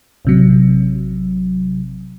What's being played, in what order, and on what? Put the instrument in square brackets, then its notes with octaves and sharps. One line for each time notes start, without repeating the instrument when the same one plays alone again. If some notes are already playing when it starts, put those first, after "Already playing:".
[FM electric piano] A1 C3 F#3